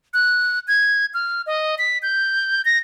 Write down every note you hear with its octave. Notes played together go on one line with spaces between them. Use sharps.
F#6
G#6
F6
D#5
B6
G6
A#6